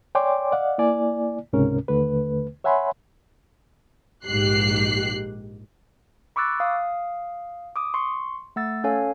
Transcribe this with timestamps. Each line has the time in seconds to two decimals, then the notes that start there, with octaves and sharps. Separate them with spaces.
0.15 C#5 D5 G5 G#5 C6 D6
0.52 D5 D#5 F5 F#5
0.78 A#3 E4 D5 G#5
1.53 C#2 G#2 C3 C#4 A#4
1.88 D#2 D3 A3 B4
2.64 C#5 E5 F#5 G#5 B5 C6
4.25 A#1 G#2 G4 F#6 C7
6.36 B5 C#6 D6 E6 F#6 A6
6.60 F5 D#6
7.76 D6 D#6
7.94 C6 C#6
8.56 A3 F#5 E6 A6
8.84 C#4 A4 C#5 F5 G#5